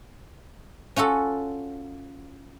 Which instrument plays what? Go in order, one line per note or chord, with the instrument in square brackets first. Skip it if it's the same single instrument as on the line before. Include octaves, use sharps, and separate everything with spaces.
[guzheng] C#4 F4 F#4 A4